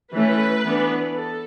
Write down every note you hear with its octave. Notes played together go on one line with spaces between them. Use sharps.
E3 A3 C#4 B4
E3 B3 D4
A4